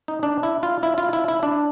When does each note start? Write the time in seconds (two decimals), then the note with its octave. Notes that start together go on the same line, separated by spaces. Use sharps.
0.08 D#4
0.23 D4
0.43 E4
0.63 F4
0.83 E4
0.98 F4
1.13 E4
1.28 E4
1.43 D4